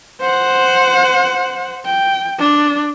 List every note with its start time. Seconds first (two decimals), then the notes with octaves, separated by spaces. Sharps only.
0.21 C5 F#5
1.85 G5
2.39 D4